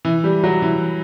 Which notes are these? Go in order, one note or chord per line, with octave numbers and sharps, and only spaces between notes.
E3
G3
F#3
E3